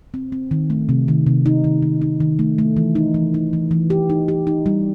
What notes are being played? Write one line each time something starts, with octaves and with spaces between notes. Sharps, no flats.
C4
C4
D#3
A3
C3
D#3
C3
D#4
D#3
D#3
D#4
D#3
A3
A3
E3
D#4
E3
D#4
E3
E3
G4
D#4
G4
D#4
G3